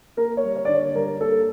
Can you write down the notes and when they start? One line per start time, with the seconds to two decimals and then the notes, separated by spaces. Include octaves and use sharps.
0.17 A#3 A#4
0.37 C#5
0.44 G3
0.56 C#5
0.65 D3 D5
0.75 C#5
0.95 G2 A#4
1.21 A#3 A4